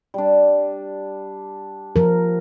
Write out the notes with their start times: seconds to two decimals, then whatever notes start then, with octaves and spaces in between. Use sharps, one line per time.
0.14 G3 D4
1.96 F3 A#4